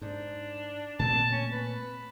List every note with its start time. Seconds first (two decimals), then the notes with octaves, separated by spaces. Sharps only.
0.02 G#2 D4
0.99 A#2 A3 C4 A5
1.32 C#4
1.51 B4